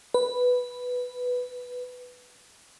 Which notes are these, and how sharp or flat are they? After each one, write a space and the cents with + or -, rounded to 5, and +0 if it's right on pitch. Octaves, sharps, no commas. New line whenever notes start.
B4 +0